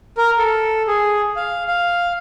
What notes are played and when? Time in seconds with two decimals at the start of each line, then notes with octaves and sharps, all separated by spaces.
0.18 A#4
0.38 A4
0.88 G#4
1.36 F5
1.68 F5